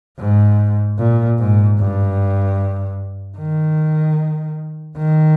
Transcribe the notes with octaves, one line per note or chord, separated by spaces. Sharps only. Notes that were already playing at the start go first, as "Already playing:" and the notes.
G#2
A#2
G#2
G2
D#3
D#3